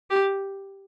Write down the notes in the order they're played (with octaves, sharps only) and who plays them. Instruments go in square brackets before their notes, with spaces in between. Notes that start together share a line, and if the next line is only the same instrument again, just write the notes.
[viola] G4